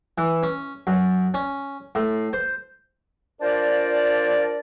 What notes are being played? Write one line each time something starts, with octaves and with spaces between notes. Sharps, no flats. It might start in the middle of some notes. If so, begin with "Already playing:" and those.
E3
C#4
F#2
C#4
A2
C5
D4 F4 A#4 C5 D5